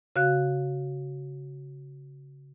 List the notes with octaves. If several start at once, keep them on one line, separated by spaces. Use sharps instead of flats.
C#3 F#4 F5 F#6